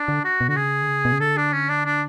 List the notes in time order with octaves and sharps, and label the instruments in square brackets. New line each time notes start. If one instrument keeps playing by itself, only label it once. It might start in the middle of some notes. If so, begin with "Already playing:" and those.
Already playing: [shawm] D4
[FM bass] D3
[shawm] F#4
[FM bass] B2
[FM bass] D3 [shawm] F#4
[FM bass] C#3 [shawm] G#4
[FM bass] D3
C#3
B2
C#3
[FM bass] D3 [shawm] A4
[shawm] D4
C#4
D4
D4